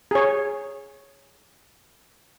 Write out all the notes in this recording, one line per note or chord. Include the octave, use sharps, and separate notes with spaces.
G#4 C#5